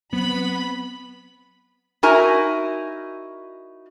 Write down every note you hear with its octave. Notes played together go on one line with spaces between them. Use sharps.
F#3 B3 C4 B5
D#4 E4 F#4 A#4 G#5 A#5